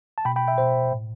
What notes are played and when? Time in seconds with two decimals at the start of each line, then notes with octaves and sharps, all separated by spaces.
0.18 A5
0.25 B2 G5 B5
0.36 G5 B5
0.47 E5 G5
0.58 B2 C5 E5
0.92 A2